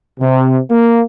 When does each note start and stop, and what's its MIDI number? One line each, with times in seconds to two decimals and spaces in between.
0.20 0.58 48
0.69 1.01 58